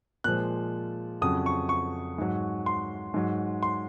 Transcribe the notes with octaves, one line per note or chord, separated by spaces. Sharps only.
A#2 F3 G#3 F#6
F2 C#3 F#3 D#6
C#6
C#6
G#2 F#3
C6
G#2 F#3
C6